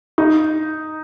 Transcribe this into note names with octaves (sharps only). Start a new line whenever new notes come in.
D#4